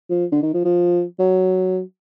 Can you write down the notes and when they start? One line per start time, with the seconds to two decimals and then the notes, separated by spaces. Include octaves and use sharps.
0.10 F3
0.32 D3
0.43 D#3
0.54 F3
0.65 F3
1.19 F#3